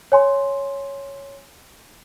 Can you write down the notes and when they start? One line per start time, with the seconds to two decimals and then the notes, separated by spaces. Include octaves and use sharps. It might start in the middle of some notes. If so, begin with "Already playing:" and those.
0.12 C#5 G#5 C6